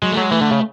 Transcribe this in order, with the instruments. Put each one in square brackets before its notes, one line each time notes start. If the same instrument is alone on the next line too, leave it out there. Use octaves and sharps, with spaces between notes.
[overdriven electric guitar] F#3 [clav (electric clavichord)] G#3
[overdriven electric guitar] A3
[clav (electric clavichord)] F#3 [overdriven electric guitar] G#3
[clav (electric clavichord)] E3 [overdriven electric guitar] A3
[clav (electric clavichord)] D3
C#3